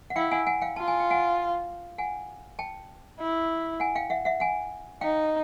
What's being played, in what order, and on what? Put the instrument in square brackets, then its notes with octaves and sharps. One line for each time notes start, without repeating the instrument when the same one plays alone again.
[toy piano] F#5
[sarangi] E4 [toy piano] F5 G5
[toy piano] F#5 G#5
F#5 G#5
F5 G5
[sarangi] F4 [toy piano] A5
[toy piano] G#5
G5
F#5 G#5
F#5 G#5
G5 A5
[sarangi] E4
[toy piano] F#5 G#5
F5 G5
E5 F#5
E5 F#5
F#5 G#5
[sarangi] D#4 [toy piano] F5 G5